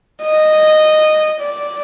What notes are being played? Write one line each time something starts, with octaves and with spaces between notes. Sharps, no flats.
D#5
D5